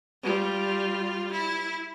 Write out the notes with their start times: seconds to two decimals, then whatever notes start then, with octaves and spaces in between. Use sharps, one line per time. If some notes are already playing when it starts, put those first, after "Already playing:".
0.22 G3 F4
1.32 E4